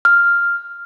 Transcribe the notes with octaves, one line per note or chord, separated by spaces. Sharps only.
F6